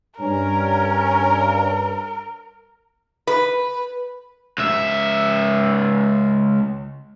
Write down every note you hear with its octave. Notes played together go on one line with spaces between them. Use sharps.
G2 C#4 A#4
B4
C#2 E5